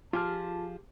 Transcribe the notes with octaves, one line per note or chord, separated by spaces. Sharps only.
F3 F4 G4 G#4 G#5 A5 F6